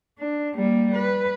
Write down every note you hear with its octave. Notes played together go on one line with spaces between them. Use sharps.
D4
G3 A#3
B4